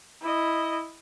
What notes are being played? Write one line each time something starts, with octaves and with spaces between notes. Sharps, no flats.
E4 D#5